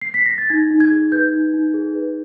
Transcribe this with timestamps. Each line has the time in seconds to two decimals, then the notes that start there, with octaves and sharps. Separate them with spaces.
0.01 C7
0.14 B6
0.26 A#6
0.38 A6
0.50 D#4 G#6
0.71 D#4
0.80 G#6
0.91 G#4
1.12 B4 G6
1.32 D#4
1.54 D#4
1.74 G#4
1.95 B4